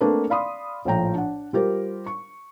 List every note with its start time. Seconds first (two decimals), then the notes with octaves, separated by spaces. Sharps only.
0.01 A3 A#3 C4 D4 A#4 B4
0.30 D5 F5 B5 C6 D#6
0.85 A#1 A2 F3 G5 A#5
1.14 D4 F#5
1.53 G3 F4 G4 A#4 C5
2.06 C#6